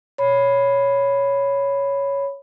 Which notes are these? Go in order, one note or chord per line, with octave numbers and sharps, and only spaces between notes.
C#5 B5